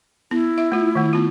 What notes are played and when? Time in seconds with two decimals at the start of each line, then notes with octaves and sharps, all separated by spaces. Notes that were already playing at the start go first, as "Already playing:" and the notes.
0.31 B3 E4
0.58 E5
0.72 A3 F4
0.95 D#3 A3
1.13 B3 F4